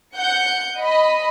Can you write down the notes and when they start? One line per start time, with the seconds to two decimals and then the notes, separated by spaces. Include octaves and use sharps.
0.16 F#5 G6 C#7
0.80 D#5 B5